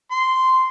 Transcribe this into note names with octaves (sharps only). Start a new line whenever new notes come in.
C6